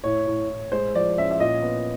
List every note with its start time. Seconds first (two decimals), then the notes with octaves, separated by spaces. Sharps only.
0.04 A2 C#5
0.27 A2
0.49 A2
0.72 G#3 C5
0.95 F3 D5
1.18 C#4 E5
1.31 E5
1.40 A#2 D#5
1.62 B3